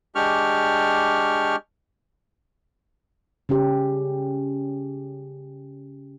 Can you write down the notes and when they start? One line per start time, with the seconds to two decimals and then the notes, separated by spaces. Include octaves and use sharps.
0.15 G#3 D4 G4 C#6 F6
3.49 C#3 C#4 G4